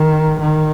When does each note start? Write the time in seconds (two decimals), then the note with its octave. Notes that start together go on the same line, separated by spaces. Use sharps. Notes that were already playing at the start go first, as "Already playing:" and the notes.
Already playing: D#3
0.40 D#3